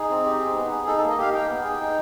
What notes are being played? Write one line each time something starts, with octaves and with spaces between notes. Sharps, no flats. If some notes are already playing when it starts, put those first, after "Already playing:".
Already playing: D#4 G#4
C4
G4
D#4
B3
G#4
D#4 A4
A4
A#3
D#5
G4 F5
D#4 G5
B3
G#4
D#4